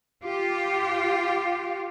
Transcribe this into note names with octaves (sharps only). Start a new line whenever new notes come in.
F4 G4